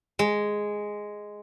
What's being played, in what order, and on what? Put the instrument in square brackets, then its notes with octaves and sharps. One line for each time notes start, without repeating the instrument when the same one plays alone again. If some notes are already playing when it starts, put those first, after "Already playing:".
[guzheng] G#3